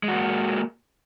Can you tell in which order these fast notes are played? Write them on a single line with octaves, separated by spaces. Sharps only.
G#3 F#4 A#3